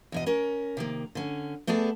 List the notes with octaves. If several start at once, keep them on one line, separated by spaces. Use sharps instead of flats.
E2 B2 D#5
C#4 A#4
C3 D#3 A#3
D3 C#4
A3 B3 G#4 D5 A5